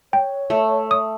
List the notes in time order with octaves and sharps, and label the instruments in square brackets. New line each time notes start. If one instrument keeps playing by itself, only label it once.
[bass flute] C#5 [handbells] G5
[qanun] A3
[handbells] D#6